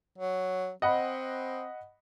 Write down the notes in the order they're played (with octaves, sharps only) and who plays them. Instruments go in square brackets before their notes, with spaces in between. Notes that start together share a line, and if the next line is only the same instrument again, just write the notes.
[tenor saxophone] F#3
[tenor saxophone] C4 [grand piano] D#5 F#5 B5